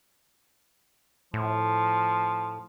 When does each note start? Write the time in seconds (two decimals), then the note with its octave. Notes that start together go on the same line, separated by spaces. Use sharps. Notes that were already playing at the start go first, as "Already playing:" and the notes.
1.34 A2 F3